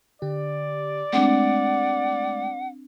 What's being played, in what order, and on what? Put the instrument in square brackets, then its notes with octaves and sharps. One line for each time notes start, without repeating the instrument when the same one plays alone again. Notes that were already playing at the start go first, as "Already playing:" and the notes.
[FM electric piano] D3 G4 [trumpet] D5
[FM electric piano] G#3 A3 [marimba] C4 D4 [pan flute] F#5